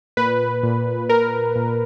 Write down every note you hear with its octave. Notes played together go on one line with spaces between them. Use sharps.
A#2 B4
A#2
A#2 A#4
A#2